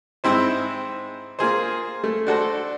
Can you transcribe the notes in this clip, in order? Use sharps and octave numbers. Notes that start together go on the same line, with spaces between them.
G#2 C4 E4 C5
A#3 F4 G#4 C5
A3
D4 F#4 A4 C5